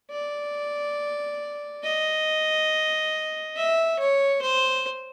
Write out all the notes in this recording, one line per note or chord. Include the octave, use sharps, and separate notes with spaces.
D5
D#5
E5
C#5
C5